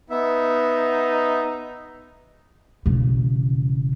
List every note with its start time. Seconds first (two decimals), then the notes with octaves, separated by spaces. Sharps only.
0.10 B3 D#4 E5
2.86 E1 C#3